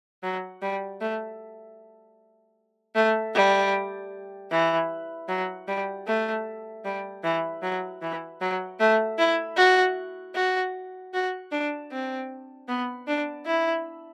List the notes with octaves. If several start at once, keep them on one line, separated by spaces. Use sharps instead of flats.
F#3
G3
A3
A3
G3
E3
F#3
G3
A3
G3
E3
F#3
E3
F#3
A3
E4
F#4
F#4
F#4
D4
C4
B3
D4
E4